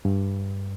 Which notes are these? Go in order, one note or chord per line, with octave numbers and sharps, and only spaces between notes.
G2